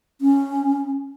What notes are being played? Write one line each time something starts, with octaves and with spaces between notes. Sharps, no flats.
C#4